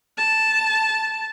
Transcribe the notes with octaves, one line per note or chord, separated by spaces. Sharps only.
A5